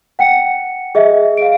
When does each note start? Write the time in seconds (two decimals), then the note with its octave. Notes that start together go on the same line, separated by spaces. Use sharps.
0.19 F#5 G5 C#7
0.95 G#4 D#5 E5
1.37 F5 D7